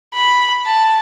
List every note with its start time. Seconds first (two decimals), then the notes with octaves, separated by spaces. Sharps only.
0.14 B5
0.66 A5